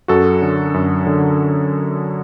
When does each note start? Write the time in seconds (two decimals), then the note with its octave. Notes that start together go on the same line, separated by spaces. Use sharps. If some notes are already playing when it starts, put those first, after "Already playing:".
0.08 F#2 F#4 A4
0.42 D3
0.74 F#2
1.07 D3